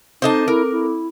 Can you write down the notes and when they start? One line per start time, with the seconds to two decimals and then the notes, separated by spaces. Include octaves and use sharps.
0.22 C4 D#4 A4 C5 D#5 A5 D6
0.48 E4 A#4
0.72 E4